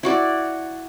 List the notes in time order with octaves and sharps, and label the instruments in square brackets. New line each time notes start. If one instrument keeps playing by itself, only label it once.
[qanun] E4 F#4 D5